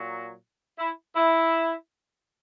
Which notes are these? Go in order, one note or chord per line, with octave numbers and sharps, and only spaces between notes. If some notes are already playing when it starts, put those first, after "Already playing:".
Already playing: A#2 F#3
E4
E4